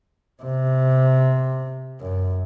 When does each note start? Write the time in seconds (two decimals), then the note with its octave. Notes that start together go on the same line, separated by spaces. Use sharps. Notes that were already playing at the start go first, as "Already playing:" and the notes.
0.43 C3
2.01 F#2